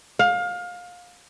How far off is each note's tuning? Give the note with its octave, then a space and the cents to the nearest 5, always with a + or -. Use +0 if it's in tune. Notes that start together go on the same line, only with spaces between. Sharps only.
F5 +25